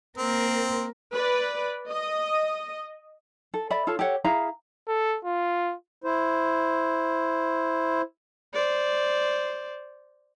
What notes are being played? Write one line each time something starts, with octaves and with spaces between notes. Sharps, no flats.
A#3 C4 A#4
B4 D5
D#5
A4
D5 E5 B5
F4 A4 C#5 A5
G4 A4 C#5 F#5
E4 G#4 F5 A#5
A4
F4
E4 C5
C5 D5